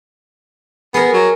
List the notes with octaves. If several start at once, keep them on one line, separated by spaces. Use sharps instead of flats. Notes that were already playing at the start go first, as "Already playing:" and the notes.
B3 G#4 A#4
F#3